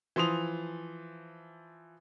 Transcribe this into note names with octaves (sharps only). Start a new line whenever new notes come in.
E3 F3 C6 D#6 F7